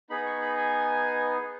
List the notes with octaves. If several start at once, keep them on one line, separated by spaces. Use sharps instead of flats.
B3 D#4 G#4 B5
C#6
B5
G#5